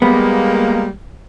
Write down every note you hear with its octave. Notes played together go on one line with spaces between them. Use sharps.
G3 G#3 A#3 B3